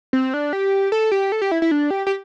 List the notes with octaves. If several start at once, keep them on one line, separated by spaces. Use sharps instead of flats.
C4
D4
G4
A4
G4
A4
G4
E4
E4
D4
G4
G4